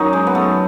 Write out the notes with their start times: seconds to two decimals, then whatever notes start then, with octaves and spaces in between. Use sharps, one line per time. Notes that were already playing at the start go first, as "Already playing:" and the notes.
Already playing: F#2 D#3 F#3 D#4
0.13 G#3
0.27 B3
0.35 A3